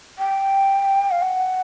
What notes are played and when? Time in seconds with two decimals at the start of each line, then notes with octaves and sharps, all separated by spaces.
0.19 G5
1.11 F5
1.22 F#5